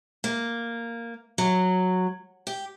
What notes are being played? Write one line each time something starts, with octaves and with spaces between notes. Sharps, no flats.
A#3
F#3
G4